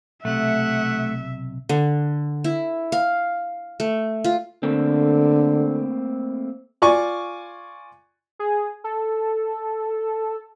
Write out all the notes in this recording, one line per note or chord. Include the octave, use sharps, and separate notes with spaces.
B1 C3 A3 E5 F#5
D3
E4
F5
A3
F4
D3 A3 A#3 C4
F4 D5 G#5 C#6
G#4
A4